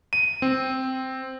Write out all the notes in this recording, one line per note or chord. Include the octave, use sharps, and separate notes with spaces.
D#7
C4